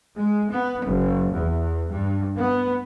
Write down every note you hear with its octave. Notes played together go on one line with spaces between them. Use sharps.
G#3
B3
F#1
E2
G2
B3